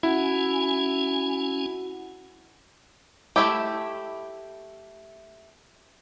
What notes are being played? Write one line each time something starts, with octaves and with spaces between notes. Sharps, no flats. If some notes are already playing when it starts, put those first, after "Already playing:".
C#4 E4 F#4 F#5 G#5
A3 E4 G4